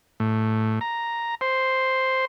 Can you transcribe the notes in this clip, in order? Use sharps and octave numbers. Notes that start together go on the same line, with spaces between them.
A2
A#5
C5